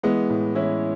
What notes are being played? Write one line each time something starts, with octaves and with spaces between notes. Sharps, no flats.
E3 G#3 B3
A2
E3 C#4 E4